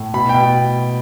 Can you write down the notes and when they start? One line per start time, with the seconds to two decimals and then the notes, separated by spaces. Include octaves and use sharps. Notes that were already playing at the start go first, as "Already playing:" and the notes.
Already playing: A2
0.14 B2 B5
0.29 B2 G5